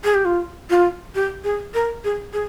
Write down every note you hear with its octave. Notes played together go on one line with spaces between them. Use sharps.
G#4
G4
F4
F4
G4
G#4
A#4
G#4
G#4